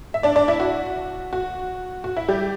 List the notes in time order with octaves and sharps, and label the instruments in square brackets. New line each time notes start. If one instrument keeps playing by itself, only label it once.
[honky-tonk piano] E5
D4 D5
D4 D5
E4
F#4
F#4
F#4
E4
G3 G4